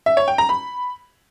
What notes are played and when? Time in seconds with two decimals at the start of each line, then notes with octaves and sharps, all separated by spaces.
0.06 E5
0.17 C#5
0.28 G5
0.38 A#5
0.49 B5